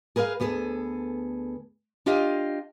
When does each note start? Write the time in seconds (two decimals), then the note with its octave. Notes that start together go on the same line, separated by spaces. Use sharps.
0.16 G#4 A#4 B4 D5 F5
0.40 D2 B3 G#4 A4
2.06 D4 F4 G4 D#5 F5